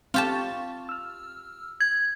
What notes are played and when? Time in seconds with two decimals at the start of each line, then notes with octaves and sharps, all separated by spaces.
0.14 C4 F4 G4 A5 C#6 A6
0.89 E6 F6
1.80 G#6